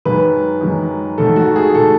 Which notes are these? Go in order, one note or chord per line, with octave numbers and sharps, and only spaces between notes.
F#2 D#3 G#3 B4
F#2 D#3 G#3
G#2 D#3 A3 A4
F#4
G#4
D#3 A3 A4